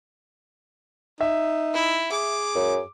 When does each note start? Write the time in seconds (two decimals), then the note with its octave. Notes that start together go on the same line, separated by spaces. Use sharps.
1.21 D#4 E5
1.74 E4
2.11 G#4 D6
2.55 F#2